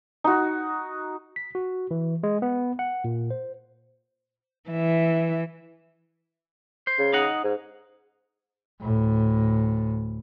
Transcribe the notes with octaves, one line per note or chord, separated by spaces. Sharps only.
D#4 F#4
B6
F#4
E3
G#3
B3
F#5
A#2
C5
E3 E5
C5
C#3
D#4 D#5 F#5
G#2
D2 A2